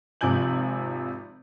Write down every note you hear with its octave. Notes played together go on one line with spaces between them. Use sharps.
G#1 C3 F3 G#5 G6 F#7